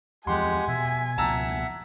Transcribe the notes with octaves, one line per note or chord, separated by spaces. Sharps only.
E2 F3 G#3 G4 F#5 G#5 C6
B2 E5
C#2 B2 F3 E5 F#5 A5 A#5 E6